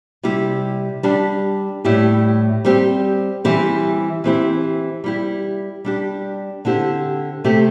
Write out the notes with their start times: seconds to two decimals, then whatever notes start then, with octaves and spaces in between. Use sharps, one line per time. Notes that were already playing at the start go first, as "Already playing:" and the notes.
0.23 C3 G3 E4 G4
1.03 G3 D4 G4
1.85 A2 G3 E4 G4
2.65 G3 C4 G4
3.44 E3 G3 C4 E4 G4
4.24 E3 C4 E4 G4
5.04 G3 E4 G4
5.85 G3 D4 G4
6.65 D3 C4 E4 G4
7.44 C3 A3 C4 G4